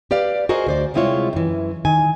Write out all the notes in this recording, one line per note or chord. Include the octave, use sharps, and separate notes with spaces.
G4 B4 D5 F5
F#4 G#4 A#4 C5 D#5
D2 C5 D5
C3 G3 G#3 E4 F4 C#5
F#2 E3
D#3 G#5